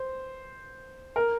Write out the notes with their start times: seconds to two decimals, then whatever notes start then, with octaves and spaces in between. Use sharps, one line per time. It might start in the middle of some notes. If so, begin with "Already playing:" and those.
Already playing: C5
1.16 A#4